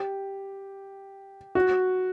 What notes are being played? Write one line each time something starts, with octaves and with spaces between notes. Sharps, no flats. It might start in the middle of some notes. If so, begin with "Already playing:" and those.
Already playing: G4
F#4